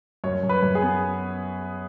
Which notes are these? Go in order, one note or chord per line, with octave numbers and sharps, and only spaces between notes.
F#2 C#5
F#2
B4
F#2
G#4
B3